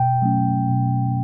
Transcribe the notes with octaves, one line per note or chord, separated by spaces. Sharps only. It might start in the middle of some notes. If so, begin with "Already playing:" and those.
Already playing: B2 G5
F#3 A3 C#4
B2